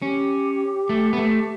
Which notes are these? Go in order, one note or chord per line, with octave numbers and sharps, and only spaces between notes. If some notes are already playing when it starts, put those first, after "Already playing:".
C#4 G4
A3
B3
A3